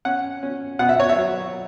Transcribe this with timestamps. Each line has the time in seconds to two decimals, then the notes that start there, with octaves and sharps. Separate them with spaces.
0.05 C#4 F#5
0.43 C#4
0.79 B2 F#5
0.89 E5
1.00 C#5
1.09 E5
1.16 F#3